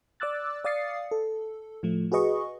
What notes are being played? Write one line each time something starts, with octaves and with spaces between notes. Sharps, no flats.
D5 D6 E6 F#6 A6
D5 F5 D#6 A6 C7 C#7
A4
A2 F3 A3
F#4 G#4 B4 D#5 C#6